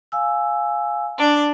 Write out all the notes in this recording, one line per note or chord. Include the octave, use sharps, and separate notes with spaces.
F5 G#5 E6
D4 D5